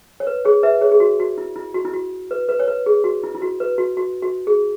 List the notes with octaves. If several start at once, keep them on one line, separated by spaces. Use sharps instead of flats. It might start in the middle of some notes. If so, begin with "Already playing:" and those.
C#5
B4
G#4 C#5
B4 E5
G#4 C#5
G#4
F#4
F#4
E4
E4
F#4
E4
F#4
B4
B4
C#5
B4
G#4
F#4
E4
E4
F#4
B4
F#4
F#4
F#4
G#4